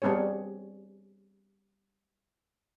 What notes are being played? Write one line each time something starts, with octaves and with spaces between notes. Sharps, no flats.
G3 B3 C4 G#4 C#5